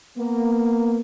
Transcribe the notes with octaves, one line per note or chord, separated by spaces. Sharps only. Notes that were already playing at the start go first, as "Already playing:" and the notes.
A#3 B3